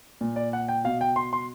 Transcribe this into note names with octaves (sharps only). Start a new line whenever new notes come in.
A#2
D5
F#5
G5
B2 F5
G5
C6
C6